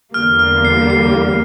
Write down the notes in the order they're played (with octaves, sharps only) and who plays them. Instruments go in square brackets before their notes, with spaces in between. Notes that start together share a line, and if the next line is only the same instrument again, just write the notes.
[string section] E2 D3 G3 A#3 [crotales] F6
[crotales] F6
C7
C7